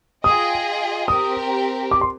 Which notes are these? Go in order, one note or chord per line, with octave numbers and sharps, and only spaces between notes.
F4 G#4 D#5 G5 D#6
C4 G4 A#4 D#6
D6
C6